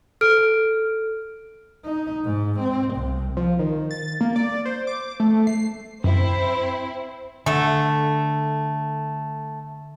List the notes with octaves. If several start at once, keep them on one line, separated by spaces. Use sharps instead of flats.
A4 F6 D7
D#4
G#2
C4
C2
F3
D#3
A6
A#3
D5
C5
D6
A3
C7
F#2 C4 E4 C5
D3 A3 A4